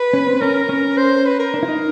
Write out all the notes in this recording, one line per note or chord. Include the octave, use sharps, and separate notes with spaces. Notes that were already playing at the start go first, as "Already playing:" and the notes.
Already playing: B4
C#4
C4
C#4 A#4
C#4
C5
B4
A#4
D4
E4
D#4